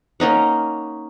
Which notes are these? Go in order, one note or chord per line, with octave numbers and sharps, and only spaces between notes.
A#3 C#4 D#4 F#5